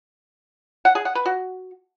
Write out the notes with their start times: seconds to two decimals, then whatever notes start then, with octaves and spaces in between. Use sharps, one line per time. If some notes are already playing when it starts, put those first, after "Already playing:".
0.85 F#5
0.95 G#4
1.05 F#5
1.15 B4
1.26 F#4